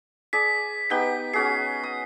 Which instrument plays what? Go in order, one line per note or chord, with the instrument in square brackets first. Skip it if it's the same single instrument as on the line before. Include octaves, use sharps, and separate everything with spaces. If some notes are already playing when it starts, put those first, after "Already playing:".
[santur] G#4 D5 [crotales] B6
[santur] B3 D#4 G4 [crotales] B6 G7
[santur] C#4 F#4 G#4 [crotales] C7
[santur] D#6